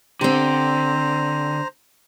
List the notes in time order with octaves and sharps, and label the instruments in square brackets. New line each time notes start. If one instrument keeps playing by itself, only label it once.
[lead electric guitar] D3 [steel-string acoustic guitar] C4 G4 [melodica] C5 A#5